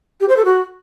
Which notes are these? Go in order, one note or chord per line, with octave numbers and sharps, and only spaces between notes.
G4
C5
A4
F#4